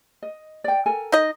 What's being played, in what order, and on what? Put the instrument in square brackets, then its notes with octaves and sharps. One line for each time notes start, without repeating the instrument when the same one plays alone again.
[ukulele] D#5
D5 G5
A4 A#4 G#5
[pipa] D#4 D#5